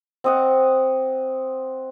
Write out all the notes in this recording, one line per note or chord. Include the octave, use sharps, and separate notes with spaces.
C4 D#5 F#5